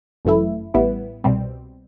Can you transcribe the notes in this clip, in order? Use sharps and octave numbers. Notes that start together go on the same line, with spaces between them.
G1 F#2 E3 A3 E4
A1 A2 G3 B3 E4
C2 B2 G3 C4